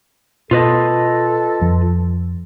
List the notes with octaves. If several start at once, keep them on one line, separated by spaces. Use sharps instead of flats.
B2 F4 A4 B4 D#5
F2 F3